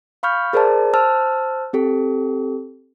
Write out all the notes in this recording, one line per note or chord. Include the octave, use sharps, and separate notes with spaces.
F5 B5 C#6 F6 G6
G#4 A#4 C5 D5 A5
C5 A5 E6 F6
C4 G4 A4